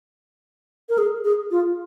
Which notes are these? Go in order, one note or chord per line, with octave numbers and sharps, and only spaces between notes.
A#4
G#4
G#4
F4